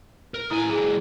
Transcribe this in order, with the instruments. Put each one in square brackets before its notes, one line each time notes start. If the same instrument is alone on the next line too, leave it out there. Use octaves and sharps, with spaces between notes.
[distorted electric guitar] A#4
[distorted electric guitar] A2 G#5 [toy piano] E4 D#6
[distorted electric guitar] F#3 G#3 [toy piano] G#4